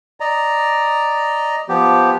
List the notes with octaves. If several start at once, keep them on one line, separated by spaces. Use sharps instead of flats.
D5 D#5 A#5
F3 B3 G4